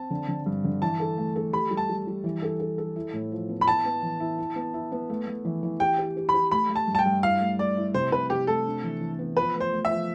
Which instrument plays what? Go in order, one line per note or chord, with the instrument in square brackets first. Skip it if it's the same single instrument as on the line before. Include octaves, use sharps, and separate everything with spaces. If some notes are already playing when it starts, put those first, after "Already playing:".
Already playing: [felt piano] C4 [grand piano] A5
[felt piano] D3
D3
G2
D3
[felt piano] E3 [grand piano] A5
[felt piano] A4
A3
A4
[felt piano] G4 [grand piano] B5
[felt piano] G3
[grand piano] A5
[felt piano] G3
G3
E3
A4
A4
A4
E4
A2
F3
B3
[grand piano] B5
[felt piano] E4 [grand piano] A5
[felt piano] B3
E3
E4
E4
B3
E4
B3
A3
A3
E3
E3
[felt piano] G4 [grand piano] G5
[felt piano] G4
G4
[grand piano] B5
[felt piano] G4
[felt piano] A3 [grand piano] B5
[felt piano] A3
[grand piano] A5
[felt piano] G2
[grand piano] A5
G5
[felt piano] G2
[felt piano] E4 [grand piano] F5
[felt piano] A3
[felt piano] A3 [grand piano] D5
[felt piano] E4
[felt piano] C3 [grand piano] C5
[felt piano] C3 [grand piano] B4
[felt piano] C3 [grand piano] G4
[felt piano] A3 [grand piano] A4
[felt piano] D4
E3
E3
B3
[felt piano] F3 [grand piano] B4
[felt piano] A3
[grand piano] C5
[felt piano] A3
[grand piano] E5
[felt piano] F3